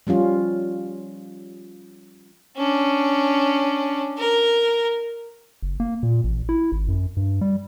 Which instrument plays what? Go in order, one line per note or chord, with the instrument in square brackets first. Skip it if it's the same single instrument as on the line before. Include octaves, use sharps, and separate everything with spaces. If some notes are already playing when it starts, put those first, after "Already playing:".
[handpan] F3 G3 C#4 F4
[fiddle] C#4 D4
A#4
[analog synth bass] F#1
A#3
A#2
A1
E4
G#1
F#2
G2
G3